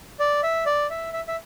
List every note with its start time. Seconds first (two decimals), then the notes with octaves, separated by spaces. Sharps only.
0.20 D5
0.43 E5
0.66 D5
0.90 E5
1.13 E5
1.28 E5